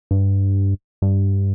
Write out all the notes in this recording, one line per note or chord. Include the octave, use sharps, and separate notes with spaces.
G2
G2